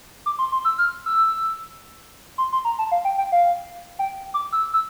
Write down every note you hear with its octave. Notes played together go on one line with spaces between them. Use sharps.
D6
C6
C6
E6
F6
E6
C6
C6
A#5
A5
F5
G5
G5
F5
G5
D6
E6
E6